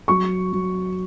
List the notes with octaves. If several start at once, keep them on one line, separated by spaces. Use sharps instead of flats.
F#3 C#6
F#3